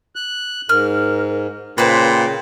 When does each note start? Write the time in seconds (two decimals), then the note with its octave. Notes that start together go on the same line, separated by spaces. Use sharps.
0.16 F#6
0.69 G#2 A#4 F6
1.78 A#2 C#3 B4 C5 G5